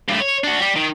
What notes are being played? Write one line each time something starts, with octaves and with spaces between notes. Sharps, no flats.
G2 A3
C#5
D4 F#4
G3
D#3